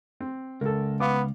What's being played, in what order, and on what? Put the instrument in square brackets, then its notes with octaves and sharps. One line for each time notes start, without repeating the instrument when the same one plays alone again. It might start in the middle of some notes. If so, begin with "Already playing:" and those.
[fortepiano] C4
[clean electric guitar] C#2 [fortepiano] A4 A#4
[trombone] B3 [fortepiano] F5 D6